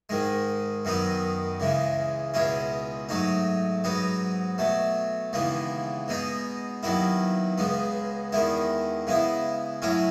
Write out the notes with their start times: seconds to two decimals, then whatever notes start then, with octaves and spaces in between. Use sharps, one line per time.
0.09 G#2 D#3 G#3
0.85 F#2 D#3 F#3 B3 D#4
1.60 C#2 C#3 E3 G#3
2.34 C#2 B2 G#3 C#4 E4
3.09 G#2 F#3 A3 D#4
3.84 G#2 F#3 B3 D#4
4.58 B2 F#3 A3
5.33 D#2 C#3 E3 G#3 B3
6.08 B2 G#3 B3 D#4
6.83 D#2 D#3 F#3 B3 E4
7.58 C#2 C#3 G#3 B3
8.32 E2 D#3 G#3 B3 E4
9.07 C#3 G#3 B3 E4
9.82 A2 F#3 C#4 E4